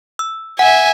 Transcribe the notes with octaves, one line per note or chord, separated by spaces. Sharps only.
E6
E5 F#5 G#5